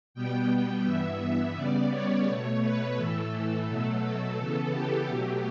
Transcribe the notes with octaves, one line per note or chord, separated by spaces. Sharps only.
B2 G3 B3 G5
G5
G2 E3 B3 E5
C#3 G3 B3 D5
C#5
B2 A3
B4
A2 E3 A3 A4
B2 F#3 A3
A4
C#3 E3 B3
G4
B2 F#3 A3